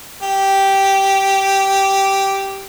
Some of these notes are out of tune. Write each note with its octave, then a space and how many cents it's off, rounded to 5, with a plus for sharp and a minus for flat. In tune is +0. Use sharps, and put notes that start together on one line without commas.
G4 -5